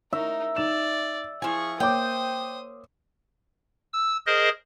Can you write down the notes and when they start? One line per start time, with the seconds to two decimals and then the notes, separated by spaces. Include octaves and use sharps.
0.13 D#4 A#4 E5
0.56 D#4 D5 E7
1.42 F3 E4 G#4 G#5 C#6
1.80 A#3 C5 C#5 G5 D6 D#6
3.93 E6
4.27 G#4 A#4 C5 D#5